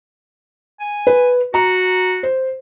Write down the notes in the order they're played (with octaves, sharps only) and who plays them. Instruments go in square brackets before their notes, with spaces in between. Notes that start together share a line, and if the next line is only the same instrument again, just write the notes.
[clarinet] G#5
[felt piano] B4
[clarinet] F#4 [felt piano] A#5
[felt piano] C5